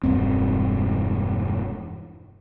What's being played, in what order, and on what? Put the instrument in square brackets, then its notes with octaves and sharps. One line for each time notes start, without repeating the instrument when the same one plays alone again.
[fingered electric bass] E1 G2 C4